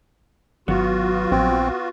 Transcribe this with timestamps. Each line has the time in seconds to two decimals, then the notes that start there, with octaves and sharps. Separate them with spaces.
0.68 G#1 F#3 B3 F4 F#4
1.31 A#1 C4